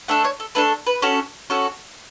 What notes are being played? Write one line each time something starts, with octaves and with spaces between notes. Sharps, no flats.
A3 D4 A4 F#5
C#5
A4
A3 D4 A4 B4
B4
C#4 F#4 A4
C#4 F#4 A4